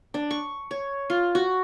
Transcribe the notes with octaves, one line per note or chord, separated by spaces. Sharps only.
D4
C#6
C#5
F4
F#4